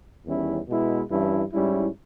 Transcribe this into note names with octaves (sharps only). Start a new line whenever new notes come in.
E2 D#3 G3 C#4 E4
B2 G#3 B3 E4
G2 E3 G3 C#4 E4
G#2 G3 C#4 E4